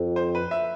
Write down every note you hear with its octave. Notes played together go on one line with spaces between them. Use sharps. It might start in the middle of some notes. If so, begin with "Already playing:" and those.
Already playing: F2
C5
B4
E5